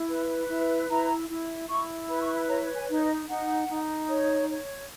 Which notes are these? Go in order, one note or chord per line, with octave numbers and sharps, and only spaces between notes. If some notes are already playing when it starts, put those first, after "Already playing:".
Already playing: E4
B4
E4
E4 A#5
E4
E4 C#6
B4 B5
C#6
B5
C#5 A#5
G#5
D#4 C#5
D#5
D#4 F#5
D#4
C#5
C#5